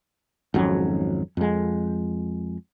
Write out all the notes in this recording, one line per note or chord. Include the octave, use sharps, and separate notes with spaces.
G#1 F2 F#3 C#4
F2 G#3